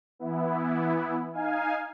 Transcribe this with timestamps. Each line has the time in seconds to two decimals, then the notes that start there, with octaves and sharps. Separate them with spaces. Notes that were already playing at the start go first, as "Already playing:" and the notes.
0.19 E3 B3 E4
1.33 D#4 F5 G#5